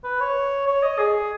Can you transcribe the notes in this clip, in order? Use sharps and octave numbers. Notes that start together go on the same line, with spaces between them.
B4
C#5
C#5
D#5
G#4